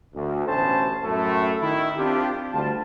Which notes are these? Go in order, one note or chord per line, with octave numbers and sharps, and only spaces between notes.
D2
A1 D2 B2 C#4 C5 A5
F#2 A2 A3
D#3 E4
C4 D4 F4 G4
D2 G3 F4 A5